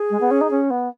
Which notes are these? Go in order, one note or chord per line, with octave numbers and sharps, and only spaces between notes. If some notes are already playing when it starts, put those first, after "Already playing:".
Already playing: G#4
G#3
B3
C#4
D#4
C#4
B3